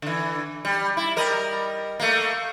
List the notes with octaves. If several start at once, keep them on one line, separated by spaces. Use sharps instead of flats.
D3 E3
G3
E4
G3 A#4 D#5
A3 A#3